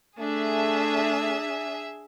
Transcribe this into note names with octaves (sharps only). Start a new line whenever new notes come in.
A3 D4 G#4 E5